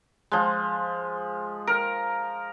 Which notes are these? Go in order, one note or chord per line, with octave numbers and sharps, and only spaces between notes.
F3 G#3
A#4